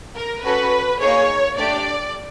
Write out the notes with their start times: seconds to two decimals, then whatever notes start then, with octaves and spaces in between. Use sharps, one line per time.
0.16 A#4
0.44 C#4 F#4 A4 B4
1.00 A#3 D#4 G#4 C#5
1.58 A3 D4 G4 D5